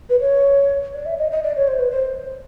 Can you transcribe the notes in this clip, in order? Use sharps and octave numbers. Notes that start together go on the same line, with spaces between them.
B4
C#5
D5
E5
D#5
D#5
D5
C#5
C5
B4
C5